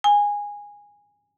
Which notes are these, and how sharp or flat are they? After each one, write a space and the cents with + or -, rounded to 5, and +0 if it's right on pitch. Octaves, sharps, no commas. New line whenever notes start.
G#5 -15